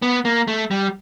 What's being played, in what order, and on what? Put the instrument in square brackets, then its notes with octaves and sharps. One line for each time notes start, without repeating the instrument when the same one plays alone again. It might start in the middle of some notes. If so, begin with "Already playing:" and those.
[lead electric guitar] B3
A#3
A3
G3